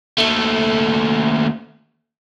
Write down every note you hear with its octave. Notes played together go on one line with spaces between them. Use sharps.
D#2 A3